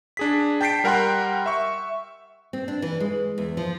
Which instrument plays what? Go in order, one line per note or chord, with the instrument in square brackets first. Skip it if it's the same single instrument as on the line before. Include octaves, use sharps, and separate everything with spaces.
[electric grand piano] D4 G#4 B6
G5 A5 G6 B6 C7 D7
G3 A#4 F#5 G5 C6 F#6
E5 C#6
[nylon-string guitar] C4
D4
E3
G#3
E2
F3